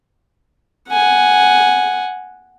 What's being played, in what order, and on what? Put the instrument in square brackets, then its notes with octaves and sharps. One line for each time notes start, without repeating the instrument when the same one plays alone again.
[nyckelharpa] F#5 G#5